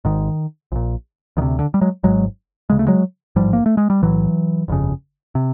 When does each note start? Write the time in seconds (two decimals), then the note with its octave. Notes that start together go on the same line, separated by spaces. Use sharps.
0.05 G#1 G#2 D#3
0.72 A#1 A#2
1.37 D2 D#3
1.42 C3
1.59 D3
1.74 G3
1.81 F#3 G#3
2.03 G#1 G#2 F#3 G#3
2.70 D2 C#3 G#3
2.79 A3
2.87 F#3 G#3
3.36 A1 G#2 F3 G3
3.53 A#3
3.66 A3
3.77 G#3
3.90 G3
4.02 B1 A2 E3 F#3
4.68 G1 F2 C#3
5.35 C3